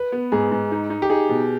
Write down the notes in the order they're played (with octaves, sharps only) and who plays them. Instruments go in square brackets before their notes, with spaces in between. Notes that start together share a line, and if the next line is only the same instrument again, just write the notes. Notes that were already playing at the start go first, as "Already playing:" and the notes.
Already playing: [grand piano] B4
[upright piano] B3
[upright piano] G#2 [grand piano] G#4
[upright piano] G#2
D#4
D#4
[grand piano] G4
[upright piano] D#4 [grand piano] G#4
[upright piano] B2